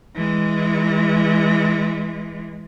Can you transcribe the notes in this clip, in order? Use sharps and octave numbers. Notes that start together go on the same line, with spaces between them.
E3 G#3